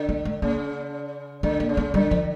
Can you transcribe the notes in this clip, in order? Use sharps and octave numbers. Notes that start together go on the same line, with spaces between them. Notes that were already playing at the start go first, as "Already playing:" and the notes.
Already playing: D3
A3
A3
C#3 A#3
D3 A3
A#3
C#3
A3
D3 G3
F3